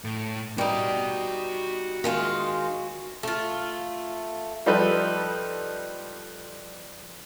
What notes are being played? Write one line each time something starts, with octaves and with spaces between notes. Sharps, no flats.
A2
G3 D#4 F#4 B5
D#3 G#3 F4
A3 F4
F3 G3 D#4 A4 B4